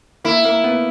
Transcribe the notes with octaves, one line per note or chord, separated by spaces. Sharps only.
A#3 E4
A#3
B3